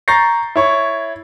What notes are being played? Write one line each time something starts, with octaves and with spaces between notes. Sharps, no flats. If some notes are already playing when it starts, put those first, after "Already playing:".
A#5 C#6 G6 A6 A#6 C7
E4 C#5 C#6